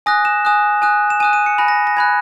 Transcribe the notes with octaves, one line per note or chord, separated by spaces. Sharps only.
G#5 D#6 F#6 A#6
E7
G#5 D#6 F#6
G#5 D#6 F#6
E7
G#5 D#6 F#6 D#7
D#7
C#7
G#5 B5 F#6 A#6
A#6
A#6
G#5 B5 F#6 G#6